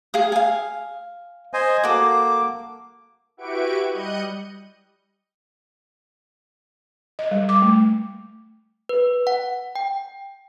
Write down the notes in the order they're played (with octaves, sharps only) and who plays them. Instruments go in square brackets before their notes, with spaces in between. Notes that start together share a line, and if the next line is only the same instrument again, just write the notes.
[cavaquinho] G#4 F5 D#6
F5 G#5
[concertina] C5 D#5 G#5
[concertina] A#3 D6 [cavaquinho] F#4 A4
[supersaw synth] E4 F#4 G4 B4 C#6 D7
G3 D#5 F#6 G6 C#7 D#7
[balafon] D#5
G3
D6
A3
[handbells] B4
F#5
G5